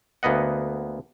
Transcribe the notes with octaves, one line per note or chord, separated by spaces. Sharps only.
D2 A#3 B3 D#5 F#5